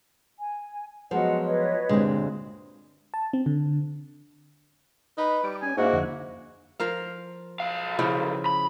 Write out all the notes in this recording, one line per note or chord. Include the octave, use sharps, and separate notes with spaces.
G#5
F3 F#3 G#3 B3 D#5 F#5
B4 C#5 D#5
D2 G2 A#2 G#3 C4
A5
C4
D3
D#4 B4
G3 D6
C#4 G#5
G#2 A#3 D4 E4 F#4 F5
F2 D3 F#5
F3 A#4 F5
B1 F5
C#3 F3 E4
B5